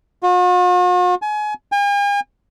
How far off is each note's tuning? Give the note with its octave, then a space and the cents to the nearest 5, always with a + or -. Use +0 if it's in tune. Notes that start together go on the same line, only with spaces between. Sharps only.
F#4 -45
G#5 +30
G#5 -45